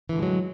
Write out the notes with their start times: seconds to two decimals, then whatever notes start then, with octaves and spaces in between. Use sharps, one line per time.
0.09 E3
0.13 D3
0.16 A2
0.19 G#3
0.22 F#3